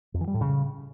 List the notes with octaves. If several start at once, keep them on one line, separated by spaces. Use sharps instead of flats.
F2
E3
G3
A2
C#3